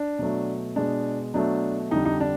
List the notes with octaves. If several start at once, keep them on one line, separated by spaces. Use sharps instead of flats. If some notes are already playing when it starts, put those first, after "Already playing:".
Already playing: D4
B2 F#3 A3
B2 G#3 D4
B2 F#3 A3 D4
F2 D3 G3 D#4
D#4
D4